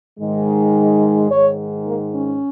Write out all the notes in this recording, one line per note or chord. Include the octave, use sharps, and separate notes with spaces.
G#2 D#3 G#3
G#2 D#3 G#3 C#5
A#3
C#4